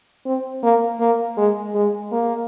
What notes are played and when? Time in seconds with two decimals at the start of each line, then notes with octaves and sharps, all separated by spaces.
0.26 C4
0.63 A#3
1.00 A#3
1.37 G#3
1.75 G#3
2.12 A#3